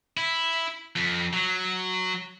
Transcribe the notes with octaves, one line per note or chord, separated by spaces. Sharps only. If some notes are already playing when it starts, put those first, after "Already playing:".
E4
F2
F#3